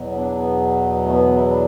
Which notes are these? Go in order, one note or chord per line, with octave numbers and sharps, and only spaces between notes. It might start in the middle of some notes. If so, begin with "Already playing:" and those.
Already playing: E2 B2 F#3
B3
D4
B3
A3
B3
E4
D4